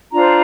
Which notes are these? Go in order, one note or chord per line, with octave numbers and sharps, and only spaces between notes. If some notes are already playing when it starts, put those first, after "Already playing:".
D4 F4 C5 A#5